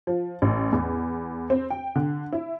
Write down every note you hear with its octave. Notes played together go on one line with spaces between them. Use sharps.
F3
A1
E2
C4
G5
D3
E4